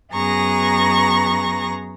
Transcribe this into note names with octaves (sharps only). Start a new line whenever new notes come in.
F#2 B3 G#4 A#5 C#6 A#6